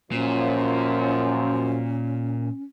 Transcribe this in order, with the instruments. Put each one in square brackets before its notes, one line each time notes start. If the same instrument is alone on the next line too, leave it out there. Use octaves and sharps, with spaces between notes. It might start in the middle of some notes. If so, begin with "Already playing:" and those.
[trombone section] F#2 F3 [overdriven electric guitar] A#2 [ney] C#4